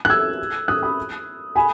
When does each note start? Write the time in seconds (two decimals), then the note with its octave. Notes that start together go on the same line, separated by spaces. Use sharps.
0.05 F#6
0.10 E6 G#6
0.68 D#6 F#6
0.82 B5 D#6
1.56 G#5 B5